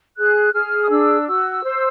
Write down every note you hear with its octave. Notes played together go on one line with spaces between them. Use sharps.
G#4 F#6
G#4 F6
D#6
D4 E6
F#4 E6
C5